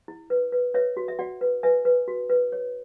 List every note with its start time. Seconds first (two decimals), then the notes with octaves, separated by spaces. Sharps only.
0.08 E4
0.30 B4
0.52 B4
0.74 B4 C#5 E5
0.97 F#4
1.08 E5
1.19 F#4 D5 F#5
1.41 B4
1.63 B4 E5 G#5
1.85 B4
2.08 F#4
2.30 B4
2.52 C#5